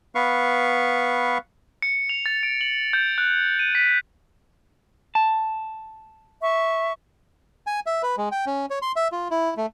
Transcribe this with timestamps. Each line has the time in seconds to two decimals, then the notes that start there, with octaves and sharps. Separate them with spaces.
0.15 B3 B4 F5 C#6
1.82 C#7
2.09 F7
2.26 A6
2.43 D7
2.61 F#7
2.93 G6
3.18 F#6
3.59 D#7
3.75 B6
5.15 A5
6.41 E5 C#6
7.67 G#5
7.86 E5
8.03 B4
8.17 G#3
8.32 G5
8.46 C#4
8.70 C#5
8.82 C6
8.96 E5
9.12 F4
9.31 E4
9.57 A3